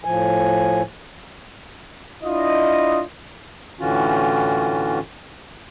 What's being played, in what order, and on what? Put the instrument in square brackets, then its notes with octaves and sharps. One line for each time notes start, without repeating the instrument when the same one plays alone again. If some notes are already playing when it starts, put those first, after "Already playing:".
[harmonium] A2 F3 G#5
[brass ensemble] D4 E4 F4 D#5
[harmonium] A2 D3 E3 C#4 F4 F#4